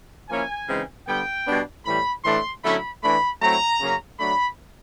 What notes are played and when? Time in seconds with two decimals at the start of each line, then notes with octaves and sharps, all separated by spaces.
0.29 F3 A#3 C#4 E4 G#5
0.68 C#3 E3 G#3 C4 D#4
1.07 D3 G3 B3 G5
1.47 B2 G3 B3 D4
1.86 A2 E3 G3 B5
2.24 A2 E3 A3 D4 C6
2.64 D3 F#3 A3 C#4 E4 B5
3.03 E3 A3 D4 B5
3.42 F#3 A3 C4 E4 A#5
3.80 C#3 F#3 A#3 C#4
4.20 F#3 A3 D4 B5